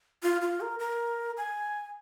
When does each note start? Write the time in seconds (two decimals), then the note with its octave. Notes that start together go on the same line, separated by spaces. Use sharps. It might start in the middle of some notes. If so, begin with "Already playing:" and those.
0.23 F4
0.41 F4
0.61 A#4
0.79 A#4
1.37 G#5